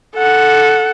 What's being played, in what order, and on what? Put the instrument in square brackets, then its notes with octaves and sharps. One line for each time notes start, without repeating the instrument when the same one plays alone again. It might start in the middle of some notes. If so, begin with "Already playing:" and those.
[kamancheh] A4 F#5